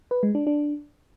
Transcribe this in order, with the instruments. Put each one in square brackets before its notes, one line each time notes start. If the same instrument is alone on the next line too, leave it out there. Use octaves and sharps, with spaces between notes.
[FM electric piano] B4
G#3
D4
D4